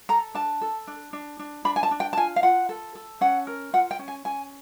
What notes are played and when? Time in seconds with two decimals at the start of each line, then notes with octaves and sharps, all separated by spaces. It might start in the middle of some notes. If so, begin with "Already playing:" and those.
0.09 A4 A#5
0.34 D4 A5
0.61 A4
0.87 D4
1.13 D4
1.39 D4
1.65 D4 B5
1.76 G#5
1.83 A5
1.91 D4
2.00 G5
2.13 A5
2.17 F4 G#5
2.36 F5
2.43 F4 F#5
2.69 A4
2.95 A4
3.21 C#4 F#5
3.47 A#4
3.73 F4 F#5
3.91 G5
3.99 C#4
4.08 G#5
4.25 C#4 G#5